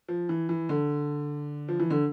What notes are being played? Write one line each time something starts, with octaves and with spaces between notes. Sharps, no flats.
F3
E3
E3
D3
F3
E3
D3